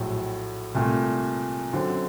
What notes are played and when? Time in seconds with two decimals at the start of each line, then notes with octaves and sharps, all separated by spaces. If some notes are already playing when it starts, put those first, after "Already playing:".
Already playing: A#1 A2 F#3
0.75 C2 A#2 A3
1.73 F#2 D3 F#3 C4